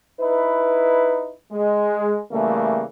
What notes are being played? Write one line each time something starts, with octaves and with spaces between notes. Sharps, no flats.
D#4 E4 B4
G#3
C#3 E3 G3 A3 A#3